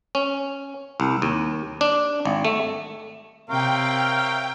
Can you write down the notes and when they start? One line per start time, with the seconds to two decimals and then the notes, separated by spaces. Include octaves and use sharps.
0.15 C#4
1.00 C2
1.22 D#2
1.81 D4
2.25 G#1
2.45 A3
3.50 C3 A#4 C#5 E5 F5 G5